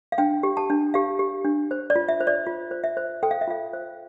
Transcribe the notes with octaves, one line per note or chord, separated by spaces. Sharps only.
F5
D4 G5
G4
A5
D4
G4 F5
G4
D4
C5
D5
F4
E5
C5
D5
F4
C5
E5
C5
A4 G5
F5
E5
F4 F5
C5